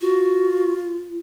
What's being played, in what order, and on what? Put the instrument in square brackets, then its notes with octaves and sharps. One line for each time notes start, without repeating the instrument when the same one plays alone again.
[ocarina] F4 [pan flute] F#4